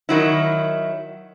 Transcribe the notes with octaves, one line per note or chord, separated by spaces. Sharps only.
D#3 F#3 E4